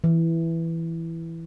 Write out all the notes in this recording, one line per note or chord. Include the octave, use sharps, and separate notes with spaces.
E3